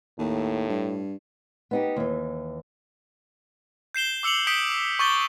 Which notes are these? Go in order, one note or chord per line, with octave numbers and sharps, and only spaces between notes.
D#2 A2
G2
B3 D#4 G4
D#2 E3
G6 C7 E7 G7
D6 E6 C#7 F7 F#7
D#6 G6 B6 C#7 D7 G7
C#6 D6 G6 A6 G7